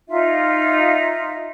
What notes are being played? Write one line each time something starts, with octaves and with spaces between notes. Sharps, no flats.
D#4 F4 E5